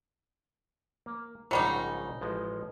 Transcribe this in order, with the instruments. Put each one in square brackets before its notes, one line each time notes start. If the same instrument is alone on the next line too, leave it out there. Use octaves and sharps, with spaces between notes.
[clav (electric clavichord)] A#3
[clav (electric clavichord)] A#1 G#2 C#3 [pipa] F#3 G3 D#4
[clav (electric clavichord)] A1 F3 G#3